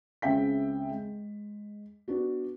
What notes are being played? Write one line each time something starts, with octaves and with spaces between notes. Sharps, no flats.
C#2 C#3 C4 E5 G5 B6
G#3
B3 D4 F#4